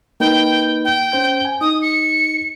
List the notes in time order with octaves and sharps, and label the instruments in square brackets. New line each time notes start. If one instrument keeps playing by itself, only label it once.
[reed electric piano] A#3 D#4 B4 [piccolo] G5
[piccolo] G5
[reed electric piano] C#4 C5 G6
G#5
[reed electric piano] D#4 [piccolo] D#6
[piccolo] C#7